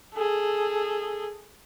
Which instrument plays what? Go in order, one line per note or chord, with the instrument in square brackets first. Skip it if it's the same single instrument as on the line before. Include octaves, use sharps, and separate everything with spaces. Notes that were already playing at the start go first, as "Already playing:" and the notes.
[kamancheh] G#4 A4